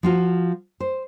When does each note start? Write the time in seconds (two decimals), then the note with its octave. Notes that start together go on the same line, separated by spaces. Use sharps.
0.03 F3 F4 F#4
0.80 C5